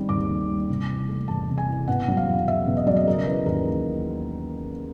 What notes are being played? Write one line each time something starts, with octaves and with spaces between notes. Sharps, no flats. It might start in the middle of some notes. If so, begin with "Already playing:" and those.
Already playing: D#3 G3 C4
D#2 D6
D#3
G3
C3
E3
A3
E2 A5
C3
G#5
E3
B2 F#5
F#3
F5
E2
E2 E5
B2
D#5
F#3 D5
D#5
C#3 A#4
E3 B4
D#2 A#4